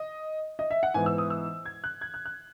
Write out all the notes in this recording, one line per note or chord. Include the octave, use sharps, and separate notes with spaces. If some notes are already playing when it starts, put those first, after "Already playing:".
Already playing: D#5
D#5
E5
F#5
G#2 E3 B3 G#5
E6
D#6
E6
G#6
F#6
G#6
F#6
F#6